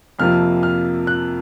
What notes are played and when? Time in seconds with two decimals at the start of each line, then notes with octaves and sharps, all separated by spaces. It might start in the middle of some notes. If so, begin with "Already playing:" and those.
0.19 F2 C3 F3 A#3 F6
0.63 F6
1.07 F#6